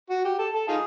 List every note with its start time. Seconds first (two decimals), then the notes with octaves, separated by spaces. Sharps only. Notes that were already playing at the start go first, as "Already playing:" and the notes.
0.10 F#4
0.25 G4
0.39 A4
0.54 A4
0.68 D#4 F4 G#4